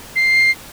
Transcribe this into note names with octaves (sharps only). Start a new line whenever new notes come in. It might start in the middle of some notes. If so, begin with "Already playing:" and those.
C7